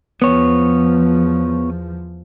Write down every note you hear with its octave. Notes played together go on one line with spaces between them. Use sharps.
E2 F3 B3 C#5